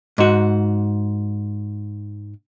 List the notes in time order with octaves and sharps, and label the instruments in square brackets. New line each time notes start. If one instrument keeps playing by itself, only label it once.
[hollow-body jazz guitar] G#2 F#4